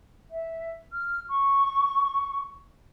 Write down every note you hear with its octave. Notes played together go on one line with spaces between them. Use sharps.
E5
F6
C#6